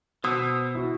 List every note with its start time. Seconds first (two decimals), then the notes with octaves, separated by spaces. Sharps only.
0.24 B2 C5 D#6 E6
0.75 E4 F#4